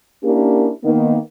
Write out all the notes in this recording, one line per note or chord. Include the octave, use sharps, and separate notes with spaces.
A#3 C#4 D4 E4 G4 A#4
D#3 A#3 B3